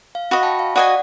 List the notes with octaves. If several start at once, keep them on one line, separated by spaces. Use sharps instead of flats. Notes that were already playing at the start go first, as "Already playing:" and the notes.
F5
F#4 D#5 B5
G5 A5 B5
F5
F#4 D5 D#5 F#5 G#5